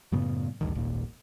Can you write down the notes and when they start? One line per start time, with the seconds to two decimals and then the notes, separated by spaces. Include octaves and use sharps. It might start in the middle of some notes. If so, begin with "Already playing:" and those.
0.12 F#2 A2 C#3 B3
0.61 A1 D2 G2 D#3
0.75 D#1 G#1 D#2 A#2